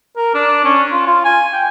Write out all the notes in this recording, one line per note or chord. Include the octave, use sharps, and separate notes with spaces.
A#4
D4
C#4
F4
F4
G#5
G5